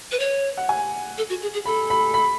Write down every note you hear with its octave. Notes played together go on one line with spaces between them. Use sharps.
B4
C#5
F#5
G#5
A4
F#4
G#4
G#4
A4 B5
B5
B5